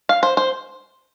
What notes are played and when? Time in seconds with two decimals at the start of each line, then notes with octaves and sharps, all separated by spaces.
0.09 F5
0.23 C5
0.37 C5